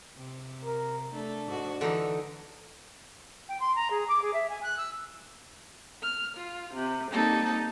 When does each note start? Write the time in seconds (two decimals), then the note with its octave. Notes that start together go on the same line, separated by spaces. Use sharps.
0.17 C3
0.64 A#4
1.14 A3 D4
1.47 G#2 F#4
1.81 D3 E3 D#4
3.49 G5
3.60 C6
3.76 A#5
3.90 G#4
4.08 D6
4.22 G#4
4.34 E5
4.49 G#5
4.63 F#6
4.78 E6
6.00 F6
6.36 F4
6.72 C3
7.09 G3 A#3 C4 D#4 A4